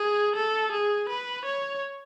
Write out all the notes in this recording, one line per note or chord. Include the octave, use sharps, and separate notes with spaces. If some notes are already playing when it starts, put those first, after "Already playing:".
Already playing: G#4
A4
G#4
B4
C#5